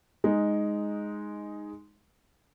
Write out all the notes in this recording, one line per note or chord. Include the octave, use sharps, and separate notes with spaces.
G#3 D#4